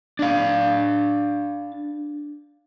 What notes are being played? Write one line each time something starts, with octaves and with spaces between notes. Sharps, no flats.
D4 F5